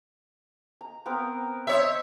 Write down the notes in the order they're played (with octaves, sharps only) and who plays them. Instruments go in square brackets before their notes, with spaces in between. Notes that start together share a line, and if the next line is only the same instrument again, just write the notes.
[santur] A#5
B3 C4 A#4
[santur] C5 D#5 B5 [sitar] C#5 E5